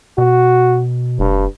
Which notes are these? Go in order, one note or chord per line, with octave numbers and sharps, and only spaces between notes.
B2 F#4
F1 G2